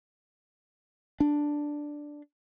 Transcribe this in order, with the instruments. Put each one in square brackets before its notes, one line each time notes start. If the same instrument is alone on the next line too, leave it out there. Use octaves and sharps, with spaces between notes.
[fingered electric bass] D4